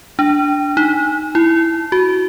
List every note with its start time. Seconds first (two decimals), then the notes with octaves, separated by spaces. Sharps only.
0.19 D4
0.77 D#4
1.35 E4
1.92 F#4